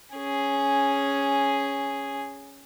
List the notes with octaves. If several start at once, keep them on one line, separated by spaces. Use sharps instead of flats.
C#4 G#4